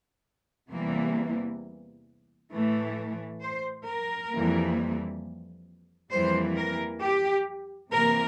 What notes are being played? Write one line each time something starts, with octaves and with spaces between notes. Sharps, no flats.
E2 C3 E3 G3 A#3
A2 E3 A3
C5
A#4
F2 E3 G3 A#3
F2 E3 G3 A#3 C5
A#4
G4
C3 E3 A#3 A#4